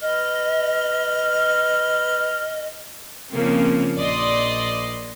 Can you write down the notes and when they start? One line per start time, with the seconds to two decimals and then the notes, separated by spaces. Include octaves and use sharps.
0.01 B4 D#5 F6
3.31 C#3 F3 A#3 C4
3.96 A#1 D5 D#5 C6